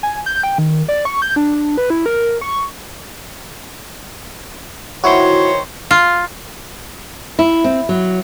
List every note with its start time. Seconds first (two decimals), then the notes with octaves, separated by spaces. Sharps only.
0.03 G#5
0.26 G6
0.43 G5
0.58 D#3
0.88 D5
1.05 C#6
1.22 G6
1.36 D4
1.77 B4
1.90 E4
2.06 A#4
2.41 C#6
5.04 D#3 E4 F#4 C5 C#5
5.91 F4
7.39 E4
7.64 C4
7.89 F#3